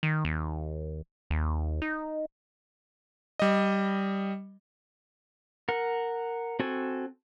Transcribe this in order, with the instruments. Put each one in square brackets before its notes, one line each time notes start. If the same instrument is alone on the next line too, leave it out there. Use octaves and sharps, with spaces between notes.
[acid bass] D#3
D#2
D#2
D#4
[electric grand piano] G3 D#5
[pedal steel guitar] A#4 F#5
C4 F#4 A4 G#5